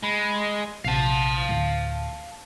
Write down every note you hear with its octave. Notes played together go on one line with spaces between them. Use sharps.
G#3 B5
A#1 C3 F5 F#5 A5
D2 A2